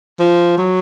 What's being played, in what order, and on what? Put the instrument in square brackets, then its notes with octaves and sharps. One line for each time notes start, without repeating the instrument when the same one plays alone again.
[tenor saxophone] F3
F#3